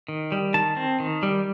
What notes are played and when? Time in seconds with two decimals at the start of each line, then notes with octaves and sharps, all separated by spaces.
0.08 D#3
0.32 G3
0.54 D#3 A5
0.77 C4
1.00 D#3
1.23 G3